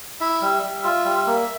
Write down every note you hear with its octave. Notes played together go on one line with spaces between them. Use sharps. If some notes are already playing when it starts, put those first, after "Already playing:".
E4 E5
G3
G3
F4
G3
A#3